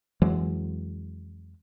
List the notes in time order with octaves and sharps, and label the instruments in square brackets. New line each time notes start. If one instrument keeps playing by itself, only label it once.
[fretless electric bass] F2 E3 F#3 G#3